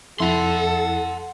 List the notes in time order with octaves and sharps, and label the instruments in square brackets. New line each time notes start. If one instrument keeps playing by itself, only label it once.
[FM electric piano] F2 E4 [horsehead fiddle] A4 [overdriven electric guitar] F#5 C6